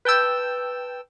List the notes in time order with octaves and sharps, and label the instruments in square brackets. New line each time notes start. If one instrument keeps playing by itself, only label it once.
[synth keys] B4 G5 A5 E6 G6